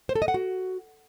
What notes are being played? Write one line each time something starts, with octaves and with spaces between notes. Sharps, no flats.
C5
A4
D#5
F#5
F#4